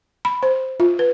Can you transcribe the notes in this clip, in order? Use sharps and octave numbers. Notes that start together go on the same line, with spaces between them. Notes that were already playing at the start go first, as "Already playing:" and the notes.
B5
C5
F4
B4